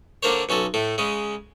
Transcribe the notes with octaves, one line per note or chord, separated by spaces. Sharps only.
D3 A#3 D4 A#4 C5 C#5
B1 C#4 F#4 A4
A2 A3
C#3 G#3 C#4